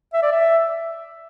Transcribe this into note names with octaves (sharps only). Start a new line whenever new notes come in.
E5
D5
E5